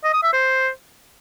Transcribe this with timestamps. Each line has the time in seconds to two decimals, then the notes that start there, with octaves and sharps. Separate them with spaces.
0.04 D#5
0.13 D#6
0.23 E5
0.33 C5